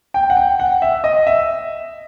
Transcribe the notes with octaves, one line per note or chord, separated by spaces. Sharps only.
G5
F#5
G5
F#5
E5
D#5
E5